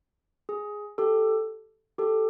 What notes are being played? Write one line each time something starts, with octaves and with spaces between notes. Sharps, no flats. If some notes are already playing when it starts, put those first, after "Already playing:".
G#4
G4 A4
G4 A4